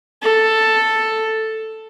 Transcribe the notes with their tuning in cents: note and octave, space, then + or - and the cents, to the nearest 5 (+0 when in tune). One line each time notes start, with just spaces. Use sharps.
A4 +5